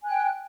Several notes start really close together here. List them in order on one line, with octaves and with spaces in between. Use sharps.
G#5 F#6 G5